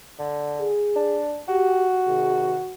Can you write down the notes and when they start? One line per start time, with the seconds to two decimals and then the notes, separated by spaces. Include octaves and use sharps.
0.19 D3
0.60 G#4
0.96 D4
1.48 F#4 G4
2.07 C3 D#3 G#4